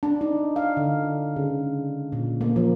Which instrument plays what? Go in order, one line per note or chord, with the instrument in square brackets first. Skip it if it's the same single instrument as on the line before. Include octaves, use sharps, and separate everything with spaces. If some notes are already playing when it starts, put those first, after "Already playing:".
[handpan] D4
D#4
F5
D3
D3
C#3
A#2
A#3
F3